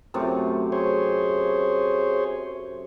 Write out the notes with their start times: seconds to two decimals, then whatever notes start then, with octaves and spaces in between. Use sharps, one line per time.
0.14 F#2 C3 A3
0.72 G#4 C5 C#5